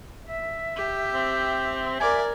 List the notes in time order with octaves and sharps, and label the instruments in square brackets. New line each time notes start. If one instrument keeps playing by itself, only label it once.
[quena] E5
[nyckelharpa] G4
[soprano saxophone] C4
[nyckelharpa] A#4 D5 [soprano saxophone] G#5